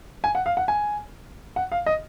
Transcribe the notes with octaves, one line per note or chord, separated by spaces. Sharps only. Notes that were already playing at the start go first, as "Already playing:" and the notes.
G#5
F#5
F5
F#5
G#5
F#5
F5
D#5